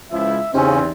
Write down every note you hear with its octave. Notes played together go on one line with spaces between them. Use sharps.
C#2 F3 E4 E5
E2 C#3 C4 C#4 D#4 G4 C5